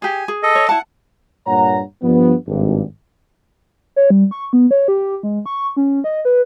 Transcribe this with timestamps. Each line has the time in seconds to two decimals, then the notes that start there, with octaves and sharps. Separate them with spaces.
0.02 G4 G#4 G#5
0.28 G#4
0.43 A4 D#5
0.55 C#5
0.69 E4 F#5 A5
1.46 G2 A#2 A#3 C#5 F#5 A#5
2.02 G2 F3 B3
2.48 G#1 G2
3.96 C#5
4.10 G3
4.31 C#6
4.53 B3
4.71 C#5
4.88 G4
5.23 G#3
5.46 C#6
5.77 C#4
6.04 D#5
6.25 B4